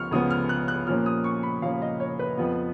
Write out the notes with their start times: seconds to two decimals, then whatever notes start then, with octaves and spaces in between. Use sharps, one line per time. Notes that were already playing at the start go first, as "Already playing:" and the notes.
Already playing: C#2 C#3 F3 B3 C#6 F6
0.11 C#2 C#3 F3 B3 D#6
0.31 F6
0.49 F#6
0.68 F#6
0.87 A#2 F3 A#3 C#4 F6
1.06 D#6
1.24 C#6
1.43 B5
1.62 A#2 F3 A#3 C#4 F5
1.82 D#5
2.00 C#5
2.19 B4
2.38 F2 F3 B3